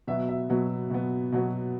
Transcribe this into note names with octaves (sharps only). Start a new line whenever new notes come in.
B2 F#3 B3 E5
E5
B2 F#3 B3
B2 F#3 B3
B2 F#3 B3